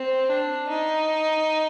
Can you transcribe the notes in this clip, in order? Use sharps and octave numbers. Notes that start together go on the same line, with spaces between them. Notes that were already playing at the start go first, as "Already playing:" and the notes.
Already playing: C4
D4
D#4